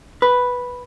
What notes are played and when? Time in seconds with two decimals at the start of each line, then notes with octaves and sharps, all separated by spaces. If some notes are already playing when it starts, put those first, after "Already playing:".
0.22 B4